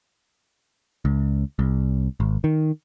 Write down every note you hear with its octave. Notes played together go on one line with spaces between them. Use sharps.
C#2
C2
G#1
D#3